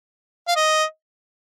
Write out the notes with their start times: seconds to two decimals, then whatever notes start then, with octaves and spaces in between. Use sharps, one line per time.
0.48 F5
0.56 D#5